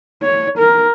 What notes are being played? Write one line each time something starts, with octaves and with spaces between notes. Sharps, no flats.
C#5
A#4